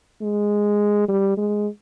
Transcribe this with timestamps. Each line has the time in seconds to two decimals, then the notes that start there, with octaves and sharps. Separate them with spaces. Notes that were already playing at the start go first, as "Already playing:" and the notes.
0.22 G#3
1.08 G3
1.37 G#3